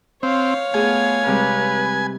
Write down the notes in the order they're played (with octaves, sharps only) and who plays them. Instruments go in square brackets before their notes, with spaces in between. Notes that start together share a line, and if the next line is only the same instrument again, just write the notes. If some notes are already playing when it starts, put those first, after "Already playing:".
[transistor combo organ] C4 [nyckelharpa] C#5 F5
[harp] A3 F4 G#4 [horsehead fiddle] B3 [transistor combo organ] G#5
[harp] C3 G3 G#3 [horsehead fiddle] B4